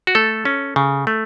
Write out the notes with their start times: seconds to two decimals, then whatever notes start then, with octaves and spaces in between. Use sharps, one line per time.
0.07 F#4
0.15 A3 A4
0.45 C#4
0.76 C#3
1.07 A3